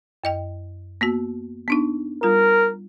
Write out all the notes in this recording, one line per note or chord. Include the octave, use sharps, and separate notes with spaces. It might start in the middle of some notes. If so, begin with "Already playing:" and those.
F#2 D#5 G5
A#3 B3 F#4
B3 D4 D#4
G3 F4 A#4